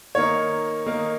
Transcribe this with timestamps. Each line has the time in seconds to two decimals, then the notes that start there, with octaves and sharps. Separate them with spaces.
0.15 D#3 A#3 D#4 C#5
0.86 D#3 A#3 D#4